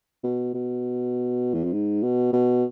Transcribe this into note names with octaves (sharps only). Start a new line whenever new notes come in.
B2
B2
E2
F2
G#2
B2
B2